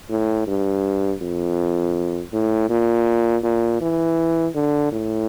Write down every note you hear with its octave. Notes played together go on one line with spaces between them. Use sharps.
A2
G2
F2
A2
A#2
A#2
E3
D3
A2